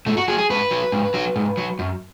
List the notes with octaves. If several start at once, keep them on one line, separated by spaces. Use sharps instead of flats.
G#2 A3
F#4
F#3 G#4
G#4
G#2 B4
F#3
G#2
F#3
G#2
F#3
F#2